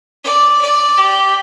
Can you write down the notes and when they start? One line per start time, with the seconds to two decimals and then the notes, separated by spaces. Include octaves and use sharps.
0.24 D5
0.61 D5
0.97 G4